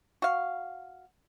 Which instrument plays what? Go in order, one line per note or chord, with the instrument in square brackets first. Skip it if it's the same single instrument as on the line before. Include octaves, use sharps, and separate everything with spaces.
[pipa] F#4 F5